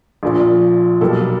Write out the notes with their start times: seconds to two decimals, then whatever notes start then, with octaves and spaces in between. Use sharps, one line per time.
0.23 A#1 A#2 F3
1.01 B1 B2 G3 A#3 A4